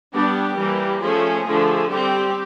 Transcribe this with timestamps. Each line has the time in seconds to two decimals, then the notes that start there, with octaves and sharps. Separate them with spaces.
0.14 G3 B3 D4 G4
0.58 E3 G3 A#3
1.02 F3 A3 C#4 G#4
1.47 D3 F3 A3
1.90 G3 C4 G4